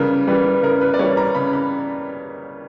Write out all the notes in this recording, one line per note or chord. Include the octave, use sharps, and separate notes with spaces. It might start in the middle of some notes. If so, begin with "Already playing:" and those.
Already playing: C#3 E3 G3 A#4 B4
E3 G3 B4
C#3 A#4
B4
D5
E3 G3 C#5
A#5
C#3 B5
B5